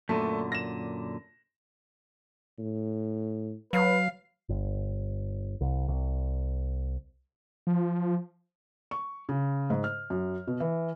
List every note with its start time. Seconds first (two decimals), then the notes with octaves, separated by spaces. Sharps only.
0.09 F#2 A#2 D3 A3 A5
0.52 A#6 E7
2.59 A2
3.73 F#3 B4 F5
4.49 G1
5.61 C2
5.88 C2
7.67 F3
8.91 C#6
9.29 C#3
9.70 G#2
9.84 F6
10.10 F#2
10.47 B2
10.60 E3